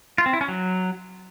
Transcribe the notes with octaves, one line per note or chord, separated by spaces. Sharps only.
F4
C4
E4
C#4
F#3